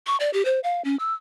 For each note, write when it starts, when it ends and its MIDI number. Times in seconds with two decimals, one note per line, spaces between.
0.07 0.17 85
0.20 0.30 74
0.33 0.45 67
0.45 0.60 72
0.64 0.82 77
0.85 0.96 61
0.99 1.14 88